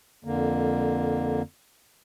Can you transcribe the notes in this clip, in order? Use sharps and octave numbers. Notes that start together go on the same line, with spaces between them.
F2 D3 A#3